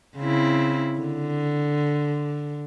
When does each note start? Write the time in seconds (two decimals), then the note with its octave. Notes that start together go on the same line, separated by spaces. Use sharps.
0.17 C#3 C4 E4
0.99 D3